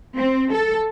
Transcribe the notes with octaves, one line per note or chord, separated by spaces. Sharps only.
C4
A4